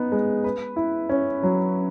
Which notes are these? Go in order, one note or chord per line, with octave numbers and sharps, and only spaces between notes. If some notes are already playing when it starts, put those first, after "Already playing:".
Already playing: B3 D#4
G#3
B4
E4
C#4
F#3